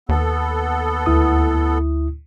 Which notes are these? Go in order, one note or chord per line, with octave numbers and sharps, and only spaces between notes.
D#2 B3 A4
D2 E4 D#6